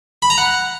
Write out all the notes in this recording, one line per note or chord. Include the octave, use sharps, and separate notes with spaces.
B5
A#5
F#5